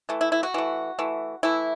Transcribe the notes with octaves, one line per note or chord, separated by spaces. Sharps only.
E3 A3
E4
E4
F#4
E3 A3
E3 A3
E3 A3 E4